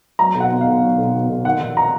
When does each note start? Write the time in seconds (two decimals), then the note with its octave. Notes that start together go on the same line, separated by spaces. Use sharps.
0.19 F#3 A#5
0.35 B1
0.40 F#5
0.51 B2
0.61 F5
0.67 B1
0.82 F#3
0.98 B1
1.14 B2
1.29 B1
1.45 D#3 F#5
1.61 A#1
1.77 A#5